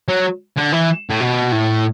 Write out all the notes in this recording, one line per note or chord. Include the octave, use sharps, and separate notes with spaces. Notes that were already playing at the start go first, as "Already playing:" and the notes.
F#3
D3
E3
A2
B2
A2